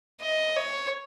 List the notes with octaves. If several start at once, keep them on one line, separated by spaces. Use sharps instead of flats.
D#5
C#5